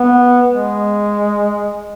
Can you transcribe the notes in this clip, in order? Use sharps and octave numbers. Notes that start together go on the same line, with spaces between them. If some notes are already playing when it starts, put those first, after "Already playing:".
Already playing: B3
G#3